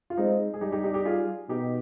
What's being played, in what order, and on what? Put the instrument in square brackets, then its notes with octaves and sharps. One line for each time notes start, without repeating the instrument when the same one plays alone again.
[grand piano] F4
[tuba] G#3 [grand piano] C4 D#4
[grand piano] G#4
[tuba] G3 [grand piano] D#4 G4
[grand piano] D#4 G4
D#4 G4
D#4 G4
F4 G#4
[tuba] B2 [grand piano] D#4 G4